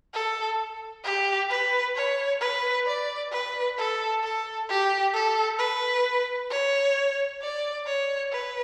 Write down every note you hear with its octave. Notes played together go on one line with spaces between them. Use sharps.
A4
G4
B4
C#5
B4
D5
B4
A4
A4
G4
A4
B4
C#5
D5
C#5
B4